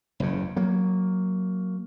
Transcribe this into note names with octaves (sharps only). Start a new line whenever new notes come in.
F#1 E2 C#3
F#3 A#3